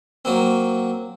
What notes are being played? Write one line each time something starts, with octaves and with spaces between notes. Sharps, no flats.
F#3 A#3 C4